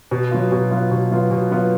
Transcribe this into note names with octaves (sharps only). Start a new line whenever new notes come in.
B2
F#3 B3 F4
B2
F#3 B3 F4
B2
F#3 B3 F4
B2
F#3 B3 F4